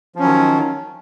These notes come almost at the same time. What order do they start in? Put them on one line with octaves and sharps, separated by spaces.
F3 C#4 F#3 D#3